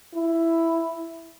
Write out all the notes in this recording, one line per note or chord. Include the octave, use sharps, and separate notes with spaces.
E4